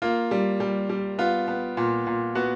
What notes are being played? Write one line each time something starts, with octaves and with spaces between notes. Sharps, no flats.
A#3 F4
G3
G3
G3
B3 F4
B3
A#2
A#2
B3 F#4